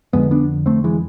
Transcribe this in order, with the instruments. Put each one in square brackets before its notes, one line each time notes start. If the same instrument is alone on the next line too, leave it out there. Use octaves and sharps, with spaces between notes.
[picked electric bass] F2 D3 G#3 B3
B3 D4
A3 C4
E3 G#3